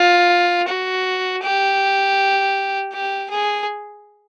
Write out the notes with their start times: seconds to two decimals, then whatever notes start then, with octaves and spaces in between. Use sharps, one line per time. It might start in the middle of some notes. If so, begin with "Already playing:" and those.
Already playing: F4
0.68 F#4
1.43 G4
2.92 G4
3.30 G#4